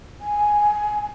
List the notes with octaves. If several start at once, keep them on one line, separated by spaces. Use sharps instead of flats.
G#5